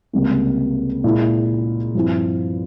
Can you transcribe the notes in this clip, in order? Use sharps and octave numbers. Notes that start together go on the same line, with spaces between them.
C#2 C3 G3 A#3
A#2 G#3 E4
G2 F3 C4 E4